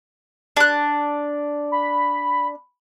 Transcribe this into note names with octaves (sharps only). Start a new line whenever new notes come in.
D4 F#6
B5